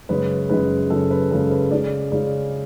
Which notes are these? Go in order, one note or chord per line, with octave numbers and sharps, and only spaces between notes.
F#2 C#3 G#3 C#4 B4
F#2 C#3 G#3 C#4 B4
F#2 C#3 G#3 C#4 A4
B4
F#2 C#3 G#3 C#4 A4
B4
C#3 G#3 C#4 D5
C#3 G#3 C#4 D5